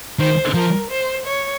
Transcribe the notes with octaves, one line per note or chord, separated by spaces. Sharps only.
D#3 C5
F3 A#4
C5
C#5